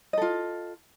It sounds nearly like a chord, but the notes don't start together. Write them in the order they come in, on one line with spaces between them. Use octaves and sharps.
D#5 A4 F4